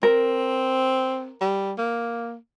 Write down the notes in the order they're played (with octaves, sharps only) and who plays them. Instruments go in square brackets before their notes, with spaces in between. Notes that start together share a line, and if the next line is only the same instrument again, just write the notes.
[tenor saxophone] C4 [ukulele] A#4
[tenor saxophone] G3
A#3